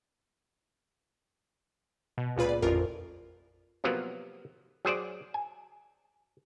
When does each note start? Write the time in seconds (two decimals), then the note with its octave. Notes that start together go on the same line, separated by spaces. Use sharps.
2.18 B2
2.36 C#2 A#2 F4 B4 B5
2.49 D5
2.62 A1 F2 F4 A#4
3.84 C3 F3 F#3 A#3 B3
4.85 F#3 G#4 C5 D5
5.34 G#5